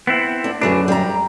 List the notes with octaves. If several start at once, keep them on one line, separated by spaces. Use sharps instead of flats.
B3 C4 E4
D4
F#2 D3 B3 D4 F#4 G#4
G3 A#5